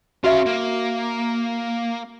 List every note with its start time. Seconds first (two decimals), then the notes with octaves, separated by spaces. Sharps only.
0.24 C#4 F#4 E5 F5
0.46 A#3